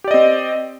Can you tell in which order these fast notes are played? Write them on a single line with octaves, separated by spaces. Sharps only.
G4 D5 D#5 C4